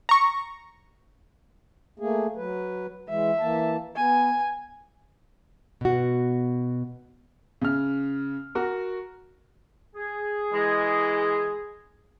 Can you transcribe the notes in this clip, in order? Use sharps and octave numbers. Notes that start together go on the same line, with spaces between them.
A#5 C#6
A3 A#3 G#4
F#3 B4
E3 G#3 E5
E3 A#3 A5
B3 G#5
B2 F#4
C#3 F6
F#4 A#4
G#4
E3 G#3